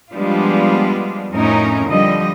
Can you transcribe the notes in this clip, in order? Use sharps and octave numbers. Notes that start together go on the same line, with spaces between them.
F3 G3 G#3 B3 D4 F4
F2 A2 C#4 D#4 A#4
D3 F3 G3 D#5